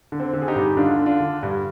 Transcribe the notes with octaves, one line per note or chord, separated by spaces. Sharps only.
D3
C4
D3
G#4
D#4 G4
G2
D3 D4 F4
D3
D4 F4
D3
G2